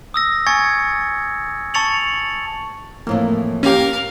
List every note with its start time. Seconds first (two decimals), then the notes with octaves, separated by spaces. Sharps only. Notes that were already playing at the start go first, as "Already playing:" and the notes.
0.14 D#6 E6 A#6
0.47 G#5 C#6 G#6 A6 C#7
1.74 A5 C#6 A6 C#7 F7 F#7
3.07 F2 A2 E3 A#3
3.63 C#4 G4 A#4 F5